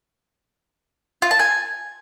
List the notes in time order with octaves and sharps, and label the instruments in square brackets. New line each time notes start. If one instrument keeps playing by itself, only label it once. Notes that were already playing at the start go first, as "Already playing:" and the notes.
[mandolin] F4
A5
G#5